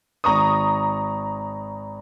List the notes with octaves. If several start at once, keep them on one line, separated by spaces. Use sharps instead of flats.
G#1 A#5 C#6 D#6